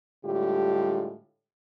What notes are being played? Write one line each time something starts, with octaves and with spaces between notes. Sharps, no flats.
A2 D3 G3 G#3 F4 G4